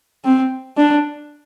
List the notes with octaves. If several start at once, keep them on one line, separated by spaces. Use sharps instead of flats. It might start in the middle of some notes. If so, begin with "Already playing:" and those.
C4
D4